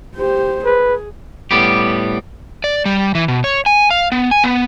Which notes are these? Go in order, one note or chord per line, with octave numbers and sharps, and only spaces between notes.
G4 C5
G#4 B4
A2 G3 B3 G4
D5
G3
E3
B2
C#5
G#5
F5
B3
G#5
B3